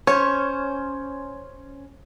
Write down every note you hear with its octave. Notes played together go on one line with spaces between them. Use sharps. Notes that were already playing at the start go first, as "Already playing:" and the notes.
C#4 C5 C#5